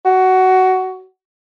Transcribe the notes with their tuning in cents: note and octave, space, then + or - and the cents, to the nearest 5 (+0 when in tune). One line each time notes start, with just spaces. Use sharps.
F#4 +15